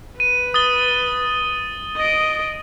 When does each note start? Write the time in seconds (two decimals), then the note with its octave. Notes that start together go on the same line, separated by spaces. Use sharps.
0.20 B4 D#7
0.54 D#6 A6 G7
1.97 D#5 D7